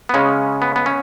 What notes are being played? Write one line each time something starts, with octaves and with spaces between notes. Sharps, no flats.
B3
C#3 G#3 C#4
B3
B3
C#4